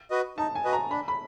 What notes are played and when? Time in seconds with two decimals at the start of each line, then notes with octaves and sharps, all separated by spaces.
0.10 F#4 B4 D#5
0.38 D#4 A5
0.55 G#5
0.64 F#4 B4 D#5
0.73 A#5
0.90 D4 B5
1.08 B5